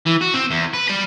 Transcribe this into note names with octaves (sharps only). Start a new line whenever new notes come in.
E3
F#4
C4
E2
B4
D5 B5